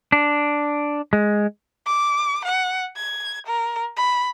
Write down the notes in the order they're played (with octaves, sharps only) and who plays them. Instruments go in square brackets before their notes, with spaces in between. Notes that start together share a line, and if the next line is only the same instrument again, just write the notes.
[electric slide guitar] D4
G#3
[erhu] D6
F#5
G#6
A#4
B5